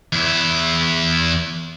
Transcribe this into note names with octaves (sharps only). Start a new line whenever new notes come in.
E2 E4